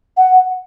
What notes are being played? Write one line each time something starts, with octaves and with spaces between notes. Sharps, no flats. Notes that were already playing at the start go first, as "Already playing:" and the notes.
F#5